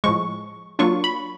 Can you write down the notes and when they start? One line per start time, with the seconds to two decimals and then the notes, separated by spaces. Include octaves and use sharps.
0.04 A2 F3 G#3 C#6
0.79 F#3 A#3 D4 F4 C#6
1.04 B5